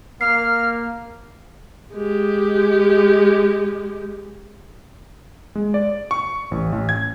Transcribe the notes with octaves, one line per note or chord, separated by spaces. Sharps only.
A#3 F6 C7
G#3 G4
G#3
D5
C#6
A1
A1
G#6